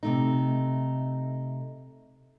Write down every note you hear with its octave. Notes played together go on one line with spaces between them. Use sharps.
C3 A3 D#4